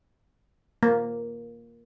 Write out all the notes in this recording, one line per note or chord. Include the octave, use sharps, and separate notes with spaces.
A#3